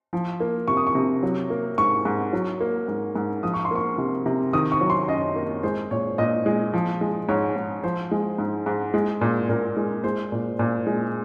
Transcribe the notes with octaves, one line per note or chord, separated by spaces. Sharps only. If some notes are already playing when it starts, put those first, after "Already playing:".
F3
A#3
C3 C#6
D#6
C#6
C3
F#3
A#3
G#2 C#6
G#2
F#3
A#3
G#2
G#2
F3 D#6
C#6
C6
A#3 C#6
C3
C3
D#3 D#6
C#6
F#3
C6
F#2 D#5
A#3
G#3 C5
A#2 C#5
A#2 D#5
G#3
F3
G#3
G#2 C#5
G#2
F3 C5
G#3
G#2
G#2
G#3
A#2
A#2 A#4
G#3
G#3 C5
A#2
A#2
G#3